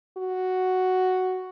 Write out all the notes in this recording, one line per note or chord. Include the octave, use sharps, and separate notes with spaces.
F#4